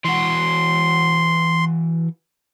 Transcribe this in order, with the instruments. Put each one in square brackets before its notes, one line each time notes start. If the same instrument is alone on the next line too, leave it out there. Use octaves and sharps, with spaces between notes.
[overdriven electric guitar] E3 F#4 [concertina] C6